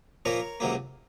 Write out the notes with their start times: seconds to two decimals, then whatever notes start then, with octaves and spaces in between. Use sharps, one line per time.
0.25 A#2 F3 A#3 A#4 C#5
0.60 C#2 C3 F#3 A#3